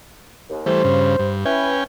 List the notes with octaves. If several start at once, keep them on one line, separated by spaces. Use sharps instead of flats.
D#2
E3 G3 A3 C5
G2 C#3
G2
C#4 E4 B4 G5 G#5